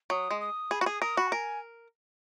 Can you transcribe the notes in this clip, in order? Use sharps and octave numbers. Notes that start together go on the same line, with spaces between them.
F#3 D#6
G#3
D#6
G#4 B5
F#4
G#4 D#6
A#4 D#6
F#4 B5
F#5
A#4 G#5